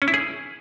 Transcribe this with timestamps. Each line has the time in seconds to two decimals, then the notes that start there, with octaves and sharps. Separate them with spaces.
0.02 C#4
0.08 E4
0.14 G#4